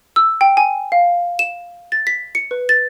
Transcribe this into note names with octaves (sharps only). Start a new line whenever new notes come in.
E6
G5
G#5
F5
E7
A6
B6
C#7
B4
A6